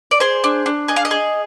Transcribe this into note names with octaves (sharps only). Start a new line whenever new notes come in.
D5
G#4 C5
D4
D4
G#4 D#5
F5
D#5
G#4